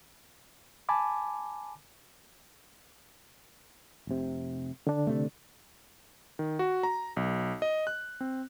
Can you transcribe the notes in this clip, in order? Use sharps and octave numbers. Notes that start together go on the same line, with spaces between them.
G#5 A5 B5 D6
F1 C3
D3 D4
C3 A3
D#3
F#4
A#5
B1
D#5
F#6
C4